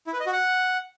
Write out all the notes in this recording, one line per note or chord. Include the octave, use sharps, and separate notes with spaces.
E4
B4
D#5
F#4
F#5